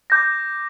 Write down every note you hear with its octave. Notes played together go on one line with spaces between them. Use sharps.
D6 G6 A#6